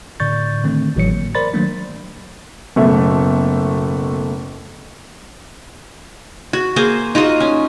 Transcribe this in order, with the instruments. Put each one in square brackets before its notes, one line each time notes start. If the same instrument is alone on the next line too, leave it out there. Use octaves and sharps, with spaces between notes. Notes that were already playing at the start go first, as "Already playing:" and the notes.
[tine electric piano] A2 D3 D5 C#6 G6 A6
D3 D#3 A3 C4
G#1 A2 E3 F#3 C#5 C#7
A#3
A#4 C5 D5 B5 C6 A6
D#3 F#3 A3 A#3 D4
[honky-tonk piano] F#1 B2 A3
[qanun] F#4
A#3 G#4 C5
D#4 F4 F#4 D#5
C#4